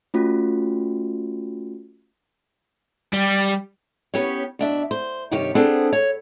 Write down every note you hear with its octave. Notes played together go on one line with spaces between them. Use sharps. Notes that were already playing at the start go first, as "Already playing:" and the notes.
A3 C#4 F4 F#4
G3
B3 C#4 G4 B4 C#5
B2 D4 E5
C5
G2 C3 D#3 G4 C#5
B3 C4 D4 G#4 A4 C5
C#5